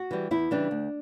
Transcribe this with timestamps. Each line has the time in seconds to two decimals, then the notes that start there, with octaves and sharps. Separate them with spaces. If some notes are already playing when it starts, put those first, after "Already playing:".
Already playing: F#4
0.11 E3 G3
0.31 E2 E4
0.51 C#3 E3 G3 D4
0.71 D2